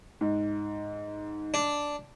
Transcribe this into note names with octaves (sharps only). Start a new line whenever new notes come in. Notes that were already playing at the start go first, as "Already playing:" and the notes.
G#2
D4